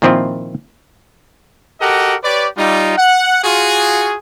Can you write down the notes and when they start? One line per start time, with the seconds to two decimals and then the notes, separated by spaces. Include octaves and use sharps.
0.02 A#2 D#3 F3 C4 E4 F4
1.80 F#4 G4 A4 A#4 D#5 F#5
2.24 G4 B4 C#5 D5
2.57 G3 D#4 F4
2.98 F#5
3.44 F4 F#4 G#4